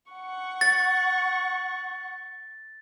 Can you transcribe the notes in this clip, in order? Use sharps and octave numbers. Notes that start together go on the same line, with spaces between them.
F#5 C#6
A6